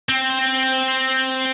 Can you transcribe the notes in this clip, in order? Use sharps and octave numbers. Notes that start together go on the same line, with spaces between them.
C4